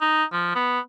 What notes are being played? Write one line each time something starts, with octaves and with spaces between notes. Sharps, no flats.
D#4
F3
B3